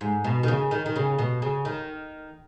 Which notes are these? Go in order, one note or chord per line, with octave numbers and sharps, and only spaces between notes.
G#2
B2
D#3
C#3
D#3
D#3
C#3
B2
C#3
D#3